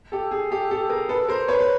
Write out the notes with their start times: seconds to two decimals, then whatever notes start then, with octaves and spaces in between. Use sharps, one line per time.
0.12 G4 A4
0.31 G#4
0.51 G4 A4
0.71 G4 A4
0.90 G#4 A#4
1.09 A4 B4
1.29 A#4 C5
1.48 B4 C#5
1.60 B4